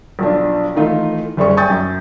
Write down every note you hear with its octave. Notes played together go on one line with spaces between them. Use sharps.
B1 F3 D4
D#3 E3 A3 D#4 F4
F#1 G3 G#4 C#6
G5 G#5 C#6 D#6 G6 A6
F#2